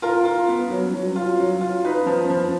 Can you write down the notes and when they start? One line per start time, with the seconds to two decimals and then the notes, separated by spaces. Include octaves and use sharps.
0.02 F4 A#4
0.25 F4
0.48 B3
0.70 F#3
0.94 F#3
1.16 F4
1.39 F#3
1.61 F4
1.84 D#4 B4
2.06 F3
2.30 F3